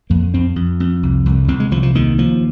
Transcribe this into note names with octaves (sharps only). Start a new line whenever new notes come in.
F2 A#3
F2 C4
F2
F2
C2
C2
C2 C4
G#3
C2 F3
F3
D#2 D#3
D#2 F3